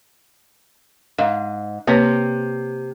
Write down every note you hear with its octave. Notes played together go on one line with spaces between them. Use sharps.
G#2 F5
C3 A#3 B4 C#5